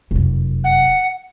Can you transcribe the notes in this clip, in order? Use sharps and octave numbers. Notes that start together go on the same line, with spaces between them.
F1 F#2
F#5